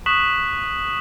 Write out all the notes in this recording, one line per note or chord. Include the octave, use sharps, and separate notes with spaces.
C#6 D#6 F#6 B6 E7 F#7